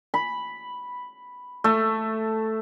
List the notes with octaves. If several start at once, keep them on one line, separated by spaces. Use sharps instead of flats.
B5
A3